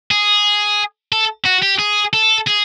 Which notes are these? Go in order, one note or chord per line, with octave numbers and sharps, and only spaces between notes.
G#4
A4
F#4
G4
G#4
A4
G#4